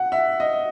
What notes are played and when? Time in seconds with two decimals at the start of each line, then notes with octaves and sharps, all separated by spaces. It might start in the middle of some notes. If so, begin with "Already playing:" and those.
Already playing: F#5
0.12 E5
0.40 D#5